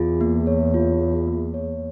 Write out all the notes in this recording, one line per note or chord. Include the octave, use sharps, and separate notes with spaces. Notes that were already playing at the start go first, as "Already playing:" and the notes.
Already playing: E2 F4 G#4
A#3
C#5
F4
G#4
A#3
C#5